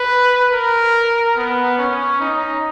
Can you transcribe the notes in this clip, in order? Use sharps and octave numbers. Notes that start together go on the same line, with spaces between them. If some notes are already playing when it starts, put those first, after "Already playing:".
Already playing: B4
A#4
B3
C#4
D#4